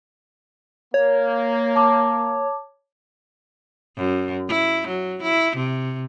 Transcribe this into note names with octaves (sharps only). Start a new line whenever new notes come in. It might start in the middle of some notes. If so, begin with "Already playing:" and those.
A#3 C#5
A5 D6
F#2
E4
F#3
E4
C3